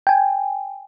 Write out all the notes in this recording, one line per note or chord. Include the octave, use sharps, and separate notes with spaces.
G5 G#5